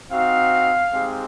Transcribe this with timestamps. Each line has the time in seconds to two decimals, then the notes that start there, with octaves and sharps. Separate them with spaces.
0.10 C4 D#4 F#4 F5
0.92 G#3 C4 D#4 G4